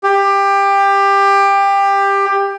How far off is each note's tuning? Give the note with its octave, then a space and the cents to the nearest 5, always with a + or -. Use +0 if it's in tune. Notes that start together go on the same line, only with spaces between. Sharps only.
G4 +20